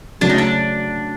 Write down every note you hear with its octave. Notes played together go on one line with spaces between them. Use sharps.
C#3 F#3 A3 C#4 D4
D#4
D4